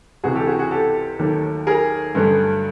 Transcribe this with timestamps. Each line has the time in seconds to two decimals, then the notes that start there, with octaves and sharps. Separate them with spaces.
0.24 C#2 C3 E3 F#4 G#4
0.35 G4 A4
0.47 F#4 G#4
0.59 F#4 G#4
0.71 G4 A4
1.19 D#2 D#3 F#3 A3
1.67 G#4 A#4
2.15 G2 D3 F#3 A3